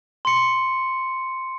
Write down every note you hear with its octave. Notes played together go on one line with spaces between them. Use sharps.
C6 C#7